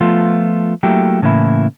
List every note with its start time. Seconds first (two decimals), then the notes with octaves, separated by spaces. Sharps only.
0.01 F3 A3 B3 F4
0.83 F#3 A3 A#3 E4 G4
1.22 A2 C#3 E3 A#3 E4